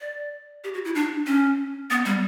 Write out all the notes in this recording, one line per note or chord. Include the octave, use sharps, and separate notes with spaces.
D5
G4
F#4
E4
D4
C#4
B3
G3